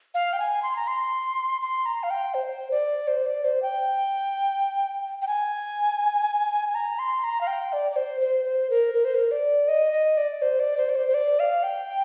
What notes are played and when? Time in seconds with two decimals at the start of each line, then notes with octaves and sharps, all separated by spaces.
0.14 F5
0.33 G5
0.39 G#5
0.62 C6
0.76 A#5
0.87 C6
1.61 C6
1.86 A#5
2.03 F5
2.10 G5
2.34 C5
2.71 D5
3.08 C5
3.26 D5
3.44 C5
3.62 G5
5.22 G5
5.27 G#5
6.69 G#5
6.75 A#5
6.99 C6
7.24 A#5
7.41 F5
7.47 G5
7.73 D5
7.91 D5
7.96 C5
8.21 C5
8.45 C5
8.70 A#4
8.94 A#4
9.05 C5
9.15 A#4
9.31 D5
9.68 D#5
9.92 D#5
10.17 D5
10.42 C5
10.60 D5
10.77 C5
10.89 D5
10.96 C5
11.09 C5
11.14 D5
11.40 F5
11.63 G5